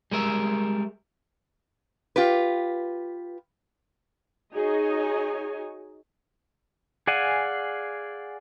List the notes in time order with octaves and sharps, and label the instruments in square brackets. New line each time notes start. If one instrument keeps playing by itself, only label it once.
[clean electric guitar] G3 G#3 A#4 E5
[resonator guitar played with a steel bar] F4 G4 B4
[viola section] D#4 F#4 G#4 C#5 D#5 G#5
[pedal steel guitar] G#4 D5 F5 F#5 G#5